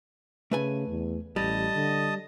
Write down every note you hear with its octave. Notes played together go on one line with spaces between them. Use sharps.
C#3 A3 B4 G#5
E2
A1 G3 D#5 A5 D#6
D3